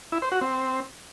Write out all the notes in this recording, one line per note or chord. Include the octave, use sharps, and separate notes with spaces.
E4
C5
F#4
C4